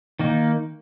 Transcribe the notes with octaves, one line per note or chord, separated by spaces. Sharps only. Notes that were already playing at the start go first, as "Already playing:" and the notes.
D#3 A#3 D#4